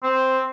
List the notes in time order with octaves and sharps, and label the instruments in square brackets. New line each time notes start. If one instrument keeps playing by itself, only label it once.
[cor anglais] C4